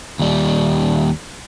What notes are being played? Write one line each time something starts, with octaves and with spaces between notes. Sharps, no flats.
D#2 G3